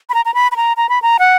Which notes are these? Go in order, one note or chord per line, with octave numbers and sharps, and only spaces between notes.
B5
A#5
A#5
B5
B5
A#5
A#5
B5
A#5
F#5